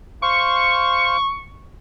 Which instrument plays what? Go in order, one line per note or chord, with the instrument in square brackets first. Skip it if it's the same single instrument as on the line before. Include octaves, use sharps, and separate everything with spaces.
[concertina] C5 F5 C6 [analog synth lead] C#6